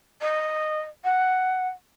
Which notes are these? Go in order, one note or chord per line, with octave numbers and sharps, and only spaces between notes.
D#5
F#5